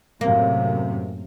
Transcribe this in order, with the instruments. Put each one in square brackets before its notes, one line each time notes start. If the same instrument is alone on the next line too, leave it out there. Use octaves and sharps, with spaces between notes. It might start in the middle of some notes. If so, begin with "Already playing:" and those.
[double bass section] F#2 A2 C3 [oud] A#3